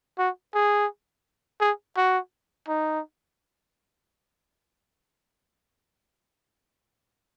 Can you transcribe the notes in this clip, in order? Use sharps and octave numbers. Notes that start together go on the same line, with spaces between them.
F#4
G#4
G#4
F#4
D#4